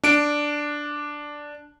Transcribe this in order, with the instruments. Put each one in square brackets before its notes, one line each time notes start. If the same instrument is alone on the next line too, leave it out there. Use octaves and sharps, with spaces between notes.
[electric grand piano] D4 D7